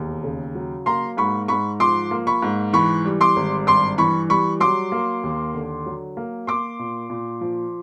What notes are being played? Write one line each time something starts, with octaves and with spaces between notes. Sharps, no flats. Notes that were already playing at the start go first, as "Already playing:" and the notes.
Already playing: E1 D#2
C#3
F#3
A#3 A#5 C6
G#2 B5 C#6
G#2 B5 C#6
F3 C6 D6
A#3
B5 C#6
G#2
E3 B5 C#6
G3
C6 D6
G#1
G2 C6 D6
E3 B5 C#6
G3 B5 C#6
F#3 C6 D6
A#3
D#2
D3
F#3
A#3
A#3 C6 D6
A#2
A#2
F3